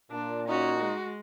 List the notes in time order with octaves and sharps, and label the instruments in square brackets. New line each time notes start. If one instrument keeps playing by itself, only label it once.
[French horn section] A#2 [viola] D4
[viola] C#4 [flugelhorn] D#4 [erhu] F#4
[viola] G#3